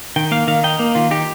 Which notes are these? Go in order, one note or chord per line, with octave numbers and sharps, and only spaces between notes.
D#3 G5
A#3 F5
D#3 F5
D#4 G5
A#3
D#3 F4
D#4 G4